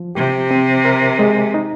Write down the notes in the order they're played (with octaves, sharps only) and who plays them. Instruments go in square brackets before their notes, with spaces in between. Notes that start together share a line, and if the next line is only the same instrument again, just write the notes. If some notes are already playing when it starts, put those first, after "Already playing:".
Already playing: [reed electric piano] F3
[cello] C3 [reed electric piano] G4
[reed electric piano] C4
A#4
G#3
D#4